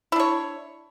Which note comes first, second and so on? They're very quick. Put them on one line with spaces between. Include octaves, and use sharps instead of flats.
E4 D4 C#5